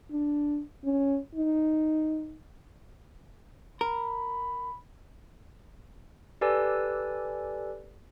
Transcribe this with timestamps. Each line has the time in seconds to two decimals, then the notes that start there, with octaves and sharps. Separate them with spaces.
0.12 D4
0.84 C#4
1.35 D#4
3.81 A#4 B5
6.41 G4 A4 B4 D5 G#5 E6